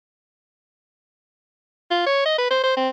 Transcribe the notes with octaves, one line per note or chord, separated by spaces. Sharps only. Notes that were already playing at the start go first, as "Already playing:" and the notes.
F4
C#5
D#5
B4
C5
C5
C4